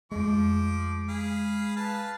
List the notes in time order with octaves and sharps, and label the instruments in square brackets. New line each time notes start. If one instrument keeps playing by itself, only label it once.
[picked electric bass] F2 A3 [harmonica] F3 D6 [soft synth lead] G#3
[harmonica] G#4 F5 B5
B4 F5 A5